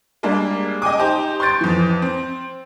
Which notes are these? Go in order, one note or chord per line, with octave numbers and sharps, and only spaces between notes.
G3 G#3 A#3 D4
D#5 G5 G#5 D6
D#4 G4 C5
C6 C#6 G6 A6 D7
F2 E3
C4